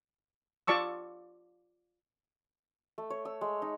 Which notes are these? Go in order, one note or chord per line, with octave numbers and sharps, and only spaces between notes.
F4 D5 A5 C#6 E6
A3
C#5
E6
G#3
D#4